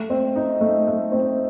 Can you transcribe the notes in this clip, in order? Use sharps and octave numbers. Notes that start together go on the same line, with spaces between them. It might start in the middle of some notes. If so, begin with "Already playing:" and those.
Already playing: A3
C4
D#4
A3
A3
C4